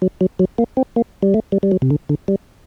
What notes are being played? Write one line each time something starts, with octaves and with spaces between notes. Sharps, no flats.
F#3
F#3
F#3
A#3
C4
A#3
G3
A3
G3
G3
F#3
C3
D3
D3
G3